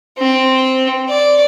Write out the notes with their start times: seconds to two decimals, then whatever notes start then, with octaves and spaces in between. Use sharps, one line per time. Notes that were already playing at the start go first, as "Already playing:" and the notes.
0.18 C4
1.10 D5